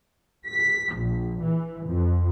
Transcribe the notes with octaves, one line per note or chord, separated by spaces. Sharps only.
B6
A#1
E3
F2